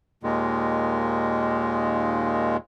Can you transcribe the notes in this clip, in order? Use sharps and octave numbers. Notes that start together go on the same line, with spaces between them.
D#2 A#2 D#3 G#3